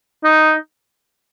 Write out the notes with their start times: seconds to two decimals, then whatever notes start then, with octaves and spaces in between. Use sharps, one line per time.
0.24 D#4